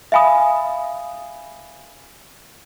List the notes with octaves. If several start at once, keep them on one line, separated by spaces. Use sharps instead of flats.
E5 F5 G#5 B5 D#6